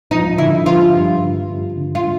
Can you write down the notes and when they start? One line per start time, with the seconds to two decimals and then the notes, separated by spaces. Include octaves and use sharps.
0.11 F3 D#4
0.38 D3 E4
0.66 F3 F4
0.94 G2
1.22 D3
1.49 G2
1.77 D3
1.95 F4